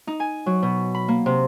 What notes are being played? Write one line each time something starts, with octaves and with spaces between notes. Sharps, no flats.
D#4
G#5
F#3
B2
B5
A#3
C3